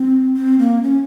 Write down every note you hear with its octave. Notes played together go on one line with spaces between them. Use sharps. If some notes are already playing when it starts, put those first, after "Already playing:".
Already playing: C4
C4
A#3
C#4